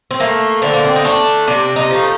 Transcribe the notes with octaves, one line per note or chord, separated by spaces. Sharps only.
C4
A3 A#3
D3 C4
A#3
C4
D#4
A3 D4
C3 D4
D#4
F3 A3